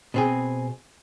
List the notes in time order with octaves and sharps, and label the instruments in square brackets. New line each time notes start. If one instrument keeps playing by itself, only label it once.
[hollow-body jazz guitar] B2 C4 G#4